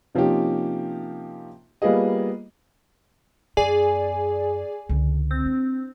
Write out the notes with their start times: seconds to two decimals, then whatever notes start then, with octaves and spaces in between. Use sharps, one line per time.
0.15 C3 F3 A#3 C#4 D#4 G4
1.82 G3 A#3 B3 F4 G#4 D#5
3.57 F#2 B3 G#4 D5 G#5
4.89 C#2 D3
5.31 C4
5.46 D4